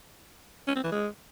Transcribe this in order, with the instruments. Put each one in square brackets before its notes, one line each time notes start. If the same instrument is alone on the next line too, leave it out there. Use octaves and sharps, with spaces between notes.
[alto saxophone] C#4
C4
E3
G#3